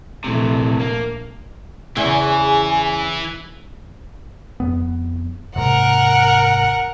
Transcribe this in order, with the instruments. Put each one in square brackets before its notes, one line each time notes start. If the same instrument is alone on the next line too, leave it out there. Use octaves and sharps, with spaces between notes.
[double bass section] A#1 A3 [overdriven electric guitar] C3 E3
[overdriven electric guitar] A#3
[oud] E2 C#3 [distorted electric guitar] E3 [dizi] G#5
[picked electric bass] F2 B3
[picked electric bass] D#2 G#2 C3 [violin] A#4 F#5